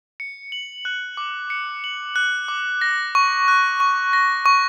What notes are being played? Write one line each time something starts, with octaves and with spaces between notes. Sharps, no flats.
C#7
F#7
F#6
D6
C#7
F#7
F#6
D6
A#6
C#6
F#6
C#6
A#6
C#6